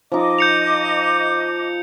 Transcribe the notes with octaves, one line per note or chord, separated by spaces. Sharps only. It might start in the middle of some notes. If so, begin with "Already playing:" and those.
F3 D#4 D#5 D6
G6 C#7 F7